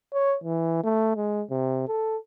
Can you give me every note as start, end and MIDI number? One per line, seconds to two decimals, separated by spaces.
0.13 0.36 73
0.44 0.79 52
0.84 1.14 57
1.16 1.43 56
1.50 1.84 48
1.88 2.17 69